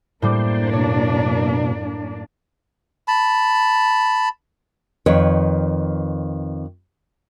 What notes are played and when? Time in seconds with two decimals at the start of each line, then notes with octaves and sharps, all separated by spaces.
0.22 F#2 A2 G3 A#3 D4 C5 D6
0.73 B2 C#5
3.08 A5 B5
5.06 F2 D#3 B4 C#5